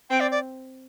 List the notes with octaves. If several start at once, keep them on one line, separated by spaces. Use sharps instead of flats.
C4 G5
D5
D5